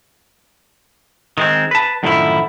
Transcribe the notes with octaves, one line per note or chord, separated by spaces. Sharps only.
D#3 G#3 C4
B4 A5
F#2 A2 D3 D#3 F3 E4